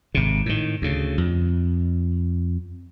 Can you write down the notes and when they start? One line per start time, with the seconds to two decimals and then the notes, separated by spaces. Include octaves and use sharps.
0.14 G#1 C3
0.46 A2 D#3
0.82 D2 C#3
1.18 F2